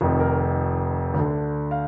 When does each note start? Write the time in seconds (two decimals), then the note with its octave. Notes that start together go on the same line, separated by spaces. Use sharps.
0.01 F1 F2 D#3
0.20 A#4
1.14 D2 D3
1.71 F5